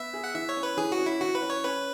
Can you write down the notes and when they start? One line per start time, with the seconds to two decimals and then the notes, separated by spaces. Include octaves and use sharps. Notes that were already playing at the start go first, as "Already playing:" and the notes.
Already playing: B3 E5
0.14 G#4
0.24 F#5
0.34 E3 E5
0.49 C#5
0.57 C#4
0.63 B4
0.77 E3 G#4
0.92 F#4
0.99 C#4
1.06 E4
1.21 E3 F#4
1.35 B4
1.42 C#4
1.50 C#5
1.64 C#4 B4